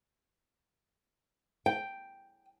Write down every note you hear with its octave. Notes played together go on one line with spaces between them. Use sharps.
G5